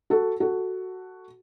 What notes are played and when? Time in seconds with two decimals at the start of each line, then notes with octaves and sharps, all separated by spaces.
0.10 F#4 A4
0.40 F#4 A4